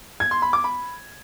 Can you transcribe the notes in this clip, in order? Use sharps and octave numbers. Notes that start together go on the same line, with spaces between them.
G#6
C6
B5
D6
B5